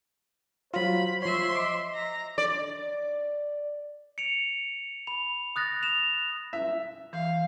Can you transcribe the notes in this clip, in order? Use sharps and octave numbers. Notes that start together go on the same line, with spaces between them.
F#3 F4 C5 B5
F3 C#5 E5 C6
D#5 D6
A#5
D5
C#7 D7 F7
B5 F7
D#6 F#6 A6 A#6
E7 F7
E5
E3 F5